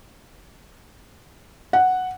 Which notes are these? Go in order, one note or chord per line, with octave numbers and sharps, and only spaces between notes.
F#5